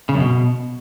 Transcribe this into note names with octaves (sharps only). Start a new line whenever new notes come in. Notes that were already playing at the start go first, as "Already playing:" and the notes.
C#3
F#2
B2